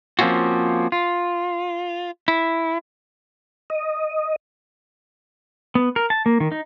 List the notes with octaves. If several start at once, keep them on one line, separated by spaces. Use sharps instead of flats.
F3 A#3 C4 C#4 F4 F#4
F4
E4
D#5
B3
A#4
A5
A#3
D#3
D#4